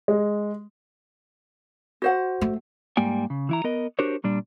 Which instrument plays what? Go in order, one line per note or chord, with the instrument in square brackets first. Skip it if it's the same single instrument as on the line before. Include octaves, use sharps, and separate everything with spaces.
[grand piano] G#3
[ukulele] F#4 C5 F#5
[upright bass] A3
[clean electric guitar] G#2 G3 A#3 G5 G#5
C#3
E3 E4 A#5
B3 A#4 D#5
D4 F#4 G4 A#4 C5 C#5
A#2 G3 D4